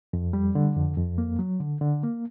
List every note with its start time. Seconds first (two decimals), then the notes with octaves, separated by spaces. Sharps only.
0.13 F2
0.33 G3
0.55 D3
0.76 F2
0.97 F2
1.18 A#3
1.39 F#3
1.60 D3
1.81 D3
2.03 A#3